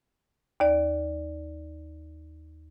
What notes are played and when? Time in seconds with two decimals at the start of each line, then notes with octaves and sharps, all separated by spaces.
0.60 D#2 D5